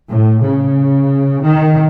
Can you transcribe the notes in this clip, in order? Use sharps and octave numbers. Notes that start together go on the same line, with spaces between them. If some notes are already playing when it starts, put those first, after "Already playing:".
A2
C#3
D#3